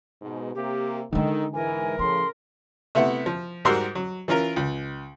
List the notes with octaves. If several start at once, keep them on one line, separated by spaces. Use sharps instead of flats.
G#2 B2
C3 A#3 G4
D3 D#3 G#3 D#4 A4
G#2 E3 A#4 G#5
A2 C#3 F3 C6
C3 A3 B3 E4 F#5
F3
G#2 G3 F#4 A#4 C6 E6
F#3
E3 C#4 F4 A#4
C#2